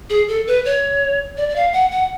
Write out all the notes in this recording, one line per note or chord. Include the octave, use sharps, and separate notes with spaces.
G#4
A4
B4
C#5
D5
D5
F5
F#5
F#5